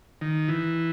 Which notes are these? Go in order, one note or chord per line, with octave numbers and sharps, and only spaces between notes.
D#3
E3